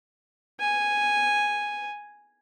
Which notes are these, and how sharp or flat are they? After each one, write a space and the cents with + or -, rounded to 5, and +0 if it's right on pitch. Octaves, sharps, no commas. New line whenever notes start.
G#5 -5